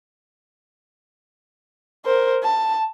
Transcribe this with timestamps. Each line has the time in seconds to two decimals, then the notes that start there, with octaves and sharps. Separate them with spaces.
2.06 A#4 C5
2.43 A5